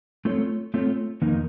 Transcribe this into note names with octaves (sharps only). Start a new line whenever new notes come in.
A3 C4 F4 A4 C#5
A3 C4 F4 A4 C#5
F2 D#3 A#3 D#4 A#4